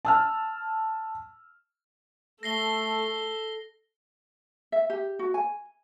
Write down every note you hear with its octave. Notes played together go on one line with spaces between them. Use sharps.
A5 E6 F6
A3 A4 A#6 C7 G7
E5
G4
F#4
G#5